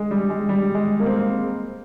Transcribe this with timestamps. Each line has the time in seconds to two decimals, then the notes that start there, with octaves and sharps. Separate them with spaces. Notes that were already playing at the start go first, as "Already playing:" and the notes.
Already playing: G#3
0.11 G3
0.30 G#3
0.49 G3
0.75 G#3
1.00 A#3
1.06 C4
1.14 A#3